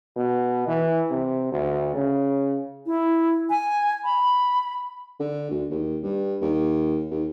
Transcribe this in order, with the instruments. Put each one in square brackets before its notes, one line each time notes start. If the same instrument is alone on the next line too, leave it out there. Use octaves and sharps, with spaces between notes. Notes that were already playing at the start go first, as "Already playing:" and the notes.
[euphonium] B2
E3
C3
D2
C#3
[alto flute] E4
G#5
B5
[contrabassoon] D3
D2
D#2
G2
D#2
D#2